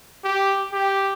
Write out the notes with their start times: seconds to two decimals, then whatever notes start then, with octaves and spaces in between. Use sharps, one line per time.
0.24 G4
0.72 G4